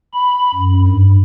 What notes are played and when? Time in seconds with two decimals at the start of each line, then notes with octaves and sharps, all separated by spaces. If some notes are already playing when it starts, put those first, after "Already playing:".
0.14 B5
0.54 F#2
0.87 G2